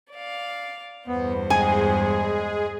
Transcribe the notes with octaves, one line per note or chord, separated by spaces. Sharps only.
D5 F5
E2 G2 B3 C5
G#3 G#4 G#5